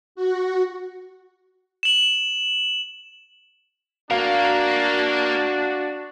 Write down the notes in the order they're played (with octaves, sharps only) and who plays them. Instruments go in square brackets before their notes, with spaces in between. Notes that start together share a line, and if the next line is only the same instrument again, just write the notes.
[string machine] F#4
[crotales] E7 F#7
[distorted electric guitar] A#3 A#4 [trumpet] D4 [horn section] F#4 [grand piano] F5